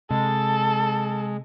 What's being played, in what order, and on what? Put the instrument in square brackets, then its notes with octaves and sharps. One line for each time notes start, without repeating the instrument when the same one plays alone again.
[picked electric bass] C3 [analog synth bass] G#3 [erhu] A4